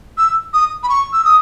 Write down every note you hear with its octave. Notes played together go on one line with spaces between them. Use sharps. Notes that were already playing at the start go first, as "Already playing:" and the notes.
E6
D#6
B5
C#6
E6
D#6